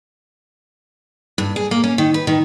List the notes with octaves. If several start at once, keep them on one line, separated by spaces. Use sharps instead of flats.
G2
G#4
A#3
C#4
D#3
B4
D#3